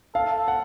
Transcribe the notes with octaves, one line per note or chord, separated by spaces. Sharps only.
A4 F5
F#5